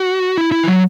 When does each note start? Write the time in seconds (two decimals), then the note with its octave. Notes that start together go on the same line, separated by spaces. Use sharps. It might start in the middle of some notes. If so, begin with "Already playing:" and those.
Already playing: F#4
0.38 E4
0.52 E4
0.64 E3
0.68 F#3